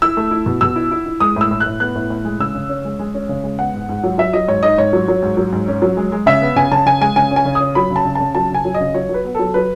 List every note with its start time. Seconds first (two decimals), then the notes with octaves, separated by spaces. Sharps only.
0.02 E4 E6
0.17 A3
0.31 E4
0.46 B2
0.61 B2 E6
0.76 E4
0.91 E4
1.06 E4
1.20 G#3 D#6
1.36 A2 E6
1.51 A2
1.60 F#6
1.66 A2
1.80 B3 F#6
1.95 A2
2.10 A2
2.25 G#3
2.39 C#3 E6
2.54 C#3
2.69 C#4
2.85 G#3
2.99 G#3
3.14 C#4
3.29 C#3
3.44 G#3
3.59 B3 F#5
3.74 G#2
3.89 G#2
4.03 F#3
4.18 F#3 E5
4.33 F#3 D#5
4.48 G#2 C#5
4.63 D#4 D#5
4.78 G#2 C#5
4.93 F#3
5.08 F#3
5.22 G#2
5.37 F#3
5.52 G#2
5.68 C#4
5.82 F#3
5.97 G#3
6.12 G#3
6.26 C#3 E5
6.42 B3
6.56 C#3 G#5
6.71 C#3 A5
6.86 C#3 G#5
7.01 G#3 G#5
7.16 C#3 G#5
7.31 C#4
7.36 G#5
7.45 C#3
7.55 C#4 D#6
7.75 F#3 B5
7.90 C#3
7.96 A5
8.05 C#3
8.15 C#3 A5
8.35 F#3 A5
8.50 C#3 G#5
8.65 F#3
8.74 D#5
8.80 C#3
8.94 F#3 C#5
9.09 F#3
9.14 B4
9.25 B3
9.35 F#3 A4
9.54 F#3 B4